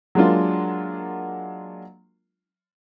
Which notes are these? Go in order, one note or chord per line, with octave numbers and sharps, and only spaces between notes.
F#3 G#3 A#3 D4 F4